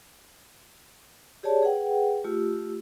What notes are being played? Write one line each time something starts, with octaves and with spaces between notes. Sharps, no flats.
G4 G#4 C#5 D5 A5
G#4 B4 F#5 G5
A3 F4 G4 E6